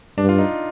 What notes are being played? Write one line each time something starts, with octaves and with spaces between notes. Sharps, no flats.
G2 D4
F4
D#4